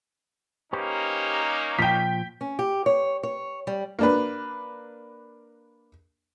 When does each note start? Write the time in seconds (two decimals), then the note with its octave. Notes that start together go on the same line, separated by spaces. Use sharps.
0.73 A#3 C#4 D#4 G4 B4 C5
1.79 A#2 F3 G5 B6
2.41 C#4
2.59 G4
2.86 C#5
3.23 C#5
3.67 G3
3.99 A#3 D4 B4